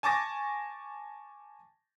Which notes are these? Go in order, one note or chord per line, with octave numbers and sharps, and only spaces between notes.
G#5 A5 C#6 D6 A6 A#6